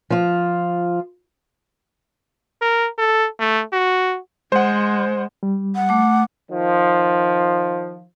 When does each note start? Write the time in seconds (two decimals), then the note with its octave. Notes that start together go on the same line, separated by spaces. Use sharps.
0.10 F3 F4
2.62 A#4
2.98 A4
3.40 A3
3.73 F#4
4.52 G#3 C5 F#5
5.43 G3
5.76 F#5
5.89 A3 D6
6.51 D#3 F3